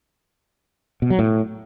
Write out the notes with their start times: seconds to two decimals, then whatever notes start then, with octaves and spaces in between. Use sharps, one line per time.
1.02 B2
1.10 F#3
1.19 A2